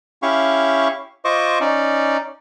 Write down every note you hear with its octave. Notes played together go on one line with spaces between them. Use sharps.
C#4 E4 G4 F5 C#6
F4 C5 D#5 C#6 D6
C#4 D#4 D5